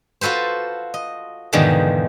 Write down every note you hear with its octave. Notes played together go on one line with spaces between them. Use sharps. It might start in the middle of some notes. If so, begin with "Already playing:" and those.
F4 F#4 A4 B4 C5
D#5
E2 G#2 B2 D3 D#3 F3